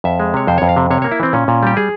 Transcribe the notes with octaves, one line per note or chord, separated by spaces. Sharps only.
F2 E5
G#3
C3 C#5
F2 C5
F2 C#5
F5
C3
C3 C#5
A#3 C#5
E4
E3 C4
A#2 C#4
A#2
G3 G4
G#4